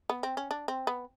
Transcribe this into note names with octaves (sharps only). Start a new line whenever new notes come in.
B3
C4
C#4
D4
C4
B3